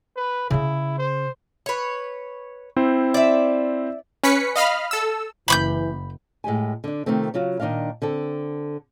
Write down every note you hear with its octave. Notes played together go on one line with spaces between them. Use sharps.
B4
C#3 C#4 E4
C5
B4 C#5
C4 E4 C5
D5 E5
C#4 B4 B6 C#7
D#5 F5 B5 F6
A4 E6
F#1 E3 B5 C#6 G6
A2 G#3 G4 G#5
D3 D4
C3 D#3 F3 A3 C4
C#3 F#3 F4 F#4
A#2 D#3 F#3 D4 D#5 F5
D3 C4 A4